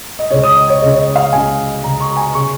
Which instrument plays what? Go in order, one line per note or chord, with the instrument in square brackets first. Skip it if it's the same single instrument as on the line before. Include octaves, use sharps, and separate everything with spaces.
[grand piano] D#5
C#2 C#3 C#5
D#6
D#5
C#5
C#3 D#5
C#2
C#5
D#5
F5
C#2 C#3 G#5
C#2 C#3 A#5
C#6
A#5
G#5
C#3 C#6